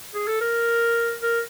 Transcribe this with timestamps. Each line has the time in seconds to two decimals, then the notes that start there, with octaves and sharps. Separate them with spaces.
0.14 G#4
0.27 A4
0.41 A#4
1.22 A#4